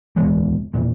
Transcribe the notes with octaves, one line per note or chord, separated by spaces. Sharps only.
D1 E2 B2 G#3
E1 A#2